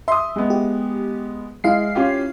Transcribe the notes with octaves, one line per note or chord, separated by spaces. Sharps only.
E5 C6 D#6
G#3 B3
G4
G#3 E4 F5 C7
C#4 F4 G4